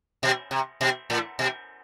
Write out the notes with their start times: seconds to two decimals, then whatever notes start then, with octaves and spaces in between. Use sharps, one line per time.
0.23 B2
0.51 C3
0.81 B2
1.10 A2
1.39 B2